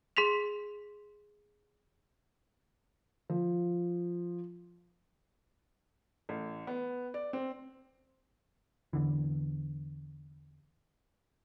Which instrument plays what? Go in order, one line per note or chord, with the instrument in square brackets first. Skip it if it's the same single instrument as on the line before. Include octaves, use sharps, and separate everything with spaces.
[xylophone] G#4 C6 B6 F7
[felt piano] F3
A1
B3
D5
C4
[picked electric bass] E2 D3 E3